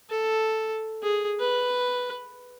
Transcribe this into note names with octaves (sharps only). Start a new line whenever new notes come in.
A4
G#4
B4